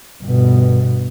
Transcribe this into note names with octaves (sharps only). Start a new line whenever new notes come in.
G1 B2